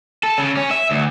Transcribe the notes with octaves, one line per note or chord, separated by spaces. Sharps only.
A4
C#3
C#4
E5
D2